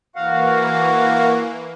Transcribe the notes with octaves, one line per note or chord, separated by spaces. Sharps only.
E3 A#3 F#4 F5 F#5